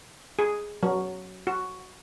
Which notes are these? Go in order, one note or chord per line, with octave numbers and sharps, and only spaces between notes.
G#4
F#3
F#4